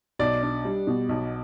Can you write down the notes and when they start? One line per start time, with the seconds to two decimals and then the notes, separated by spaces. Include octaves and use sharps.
0.19 B1 D5
0.43 D4
0.65 G3
0.87 B2
1.09 B1